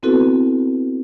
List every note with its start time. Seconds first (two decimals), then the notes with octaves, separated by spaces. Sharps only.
0.03 B3 C4 E4 F#4 A4 B4